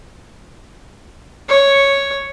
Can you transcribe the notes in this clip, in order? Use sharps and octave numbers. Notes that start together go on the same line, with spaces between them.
C#5